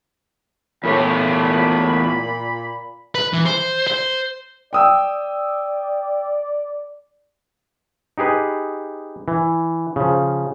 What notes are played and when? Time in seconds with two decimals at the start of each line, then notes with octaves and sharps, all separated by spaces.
0.84 E2 A#2 A3 C#5 B5
3.15 B4
3.33 E3
3.46 C5
3.87 C5
4.73 D5 G5 D#6 E6
8.18 D#4 G4 G#4 B4
9.28 E3
9.96 C#3 F3